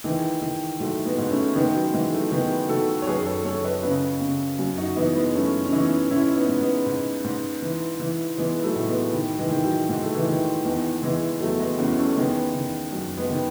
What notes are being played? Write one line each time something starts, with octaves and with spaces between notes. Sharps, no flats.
D#3 E3 G#3
D#3
G#2 F#3 A3
G#3 B3
G#2
A3 C#4
D#3 G#3 B3
G#3
F#3
G#2 E3 G#3
F#3 A3
D#3 G#3 B3
D#3 F#4 A4
C#5
F#2 G#4 B4
A4 C#5
F#2 A4 C#5
B4 D#5
C#3 B4 D#5
C#3
F#2
D#4 F#4
E3 B3 D#4
G#3 B3
F#2 A3 C#4
C#4
E3 B3 D#4
G#2 C#4 E4
B3 D#4
G#2
G#3 B3
G#2
G#2
E3
E3
E3 G#3 B3
F#3 A3
A2
G#3 B3
D#3
E3 G#3
D#3
F#3
G#2 G#3
A3
E3 G#3
D#3
E2 E3 G#3
E2 E3 G#3
E2 F#3 A3
G#3 B3
E2 A3 C#4
A3 C#4
D#3 G#3 B3
D#3
F#2
G#3 B3
D#3